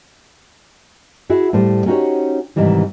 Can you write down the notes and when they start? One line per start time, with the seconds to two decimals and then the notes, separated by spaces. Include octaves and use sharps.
1.29 E4 F#4 G#4
1.53 A2 G3 C5
1.86 C#4 D#4 F#4 G4 C5 C#5
2.56 G#2 C3 D#3 E3 G3